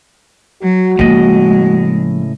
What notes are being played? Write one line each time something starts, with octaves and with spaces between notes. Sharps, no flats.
F#3 F#4
A2 C#3 F3 G#3 A#3 D#5